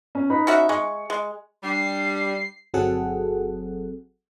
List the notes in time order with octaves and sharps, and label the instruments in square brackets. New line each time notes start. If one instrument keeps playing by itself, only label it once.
[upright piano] C#4
D#4 B4 B5
[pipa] C#4 F#4 E5
[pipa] G#3 [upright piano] C#6
[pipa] G#3
[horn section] G3 [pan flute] D4 [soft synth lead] C7
[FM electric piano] G1 F#3 C4 G#4 A4 F#5